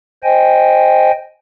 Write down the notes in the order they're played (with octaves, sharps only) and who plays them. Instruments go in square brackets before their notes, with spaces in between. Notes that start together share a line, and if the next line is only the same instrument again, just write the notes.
[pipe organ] C5 D#5 G5 G#5